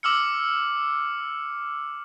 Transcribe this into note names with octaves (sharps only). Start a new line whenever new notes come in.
D6 E6 F6 C#7